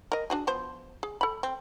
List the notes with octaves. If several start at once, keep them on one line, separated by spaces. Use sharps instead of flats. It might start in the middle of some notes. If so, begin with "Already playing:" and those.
A#4 D#5
D4 F#4 G#4
F3 B3 C5
G#4
A4 B5
C4